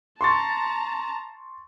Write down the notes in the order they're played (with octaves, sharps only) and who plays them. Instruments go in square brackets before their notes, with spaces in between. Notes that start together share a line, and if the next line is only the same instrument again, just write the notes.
[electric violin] A5 A#5 [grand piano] C6 C#6 A6